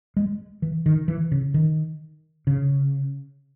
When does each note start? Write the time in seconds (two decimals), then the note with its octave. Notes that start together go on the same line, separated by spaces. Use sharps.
0.17 G#3
0.62 E3
0.86 D#3
1.08 E3
1.32 C#3
1.54 D#3
2.47 C#3